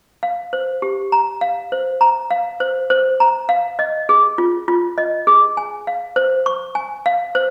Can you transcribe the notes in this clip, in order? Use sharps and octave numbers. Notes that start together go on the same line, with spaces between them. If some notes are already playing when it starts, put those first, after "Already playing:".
F5
C5
G4
A#5
F5
C5
A#5
F5
C5
C5
A#5
F5
D#5
G#4
F4
F4
D#5
G#4
G#5
F5
C5
C#6
G#5
F5
C5